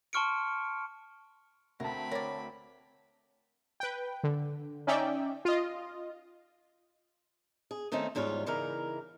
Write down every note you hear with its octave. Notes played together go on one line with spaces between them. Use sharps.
A5 C6 C#6 F6 C#7 D7
D2 C4 A#4 A5 B5
A#4 C#5 D5
B4 G5
D3
C#4 D#4 D5 E5 G5
F4 D#5
G#4
D#3 A3 C4 C#4 D#4
E2 G#2 G3 F4 C#5
C#3 E3 D#4 A#4